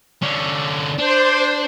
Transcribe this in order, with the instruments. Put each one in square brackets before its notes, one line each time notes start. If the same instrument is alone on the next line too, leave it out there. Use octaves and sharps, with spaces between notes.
[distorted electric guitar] D3 C#4
[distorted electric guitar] D4 [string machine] C5